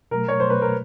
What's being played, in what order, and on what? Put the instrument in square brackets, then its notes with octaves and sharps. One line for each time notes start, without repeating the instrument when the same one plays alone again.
[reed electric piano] B2 F#3 A3 [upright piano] A#4
[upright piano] C#5
[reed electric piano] B2 F#3 A3 [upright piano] C5
[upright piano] B4
A#4